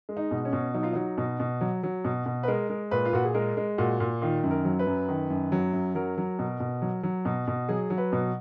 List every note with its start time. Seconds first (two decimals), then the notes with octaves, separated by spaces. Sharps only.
0.09 G#3
0.17 D#4
0.31 B2
0.45 C#4
0.53 B2
0.74 F#3 D#4
0.83 F4
0.93 F#3 D#4
1.18 B2
1.40 B2
1.61 F#3
1.83 F#3
2.05 B2
2.26 B2
2.43 B4
2.48 G#3 A#4
2.70 G#3
2.91 A#2 B4
3.05 F4
3.13 A#2 F#4
3.25 G#4
3.34 G#3 A#4
3.57 G#3
3.78 A#2 F#4
4.00 A#2
4.22 D#3 F4
4.44 F#2
4.51 A#4
4.65 F#3
4.79 B4
4.87 F#2
5.08 D#3
5.30 F#2
5.52 F#3
5.73 F#2
5.95 F#3 A#4
6.17 F#3
6.39 B2
6.60 B2
6.82 F#3
7.03 F#3
7.25 B2
7.48 B2
7.69 F#3 G#4
7.90 F#3
7.98 B4
8.12 B2